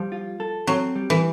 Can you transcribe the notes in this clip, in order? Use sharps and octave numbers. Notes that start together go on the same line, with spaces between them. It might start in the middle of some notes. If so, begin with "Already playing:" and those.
Already playing: F3 G3
F4
A4
F#3 C4
G3
E3